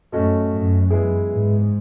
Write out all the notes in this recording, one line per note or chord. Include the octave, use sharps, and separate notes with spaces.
F#2 A3 C#4 F#4 A4 D#5
F#2
E3 G#3 B3 E4 G#4
G#2